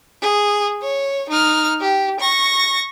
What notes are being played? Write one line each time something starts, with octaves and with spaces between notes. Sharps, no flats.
G#4
C#5
D#4 F6
G4
C#6 A#6